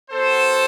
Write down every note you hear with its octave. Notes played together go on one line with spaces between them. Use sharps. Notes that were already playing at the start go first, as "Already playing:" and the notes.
B3 F#4 A4 C5